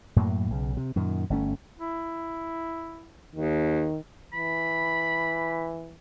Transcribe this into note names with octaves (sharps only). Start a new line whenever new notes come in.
F#2 A2 F#3 A#3
B1 C#3
C3
F#2 A#2 D#3
G1 A3 C#4
E4
D#2 D#3
E3 B5